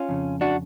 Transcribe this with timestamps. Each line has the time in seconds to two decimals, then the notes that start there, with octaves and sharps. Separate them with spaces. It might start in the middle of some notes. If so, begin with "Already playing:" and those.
Already playing: C#4 F4
0.09 F2 C#3
0.41 D4 F#4